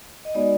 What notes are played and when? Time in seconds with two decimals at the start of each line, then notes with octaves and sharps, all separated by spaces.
0.25 D#5
0.34 G#3 B3 D#4 F#4 D5